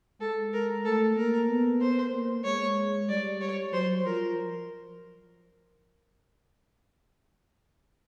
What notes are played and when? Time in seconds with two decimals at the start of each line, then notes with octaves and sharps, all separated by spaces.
0.20 G#3 A4
0.53 A#4
0.85 A3 A4
1.16 A#3 A#4
1.49 B3
1.81 C5
2.13 A#3
2.44 G#3 C#5
3.09 G3 D5
3.41 C#5
3.73 F#3 C5
4.05 F3 A#4